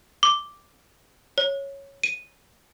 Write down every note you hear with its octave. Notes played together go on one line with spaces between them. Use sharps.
D6
C#5
D#7